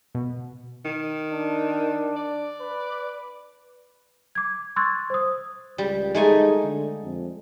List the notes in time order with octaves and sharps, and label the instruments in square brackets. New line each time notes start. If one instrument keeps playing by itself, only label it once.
[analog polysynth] B2
[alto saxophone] D#3
[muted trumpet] D4
[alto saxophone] D5
[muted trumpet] B4
[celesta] D6 G#6
C6 C#6 E6 F#6 G#6 A6
C5 D#6
[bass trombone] C#2 [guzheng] G3
[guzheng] G#3 A3 G#5 [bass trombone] D#4
[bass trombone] D3
F2